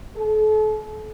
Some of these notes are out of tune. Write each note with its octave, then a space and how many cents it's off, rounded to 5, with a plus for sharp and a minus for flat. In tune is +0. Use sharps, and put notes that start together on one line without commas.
A4 -40